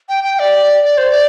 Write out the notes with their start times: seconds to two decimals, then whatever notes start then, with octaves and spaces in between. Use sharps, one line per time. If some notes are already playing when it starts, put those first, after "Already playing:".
0.09 G5
0.24 G5
0.39 D5
0.85 D5
0.98 C5
1.09 D5